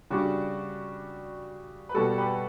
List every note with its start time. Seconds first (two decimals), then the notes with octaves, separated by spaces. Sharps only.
0.10 C#3 G3 D4 F#4
1.89 B4
1.94 B2 G3 F#4 A4
2.18 G4 B4